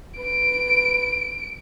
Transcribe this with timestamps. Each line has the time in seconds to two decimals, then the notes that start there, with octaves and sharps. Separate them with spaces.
0.17 B4 D7